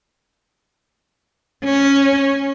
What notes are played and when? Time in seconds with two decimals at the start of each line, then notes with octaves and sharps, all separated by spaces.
1.64 C#4